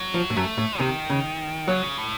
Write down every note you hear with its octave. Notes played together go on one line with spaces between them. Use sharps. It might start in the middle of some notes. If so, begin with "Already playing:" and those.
Already playing: F#3
F3
A2
F#2 A3
A2
C3 D#3
C#3
C#3 F#3
A2